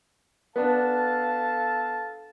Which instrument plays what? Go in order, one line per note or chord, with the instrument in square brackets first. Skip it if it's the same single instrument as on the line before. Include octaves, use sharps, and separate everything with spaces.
[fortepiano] B3 D4 [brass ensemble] A4 F5 A5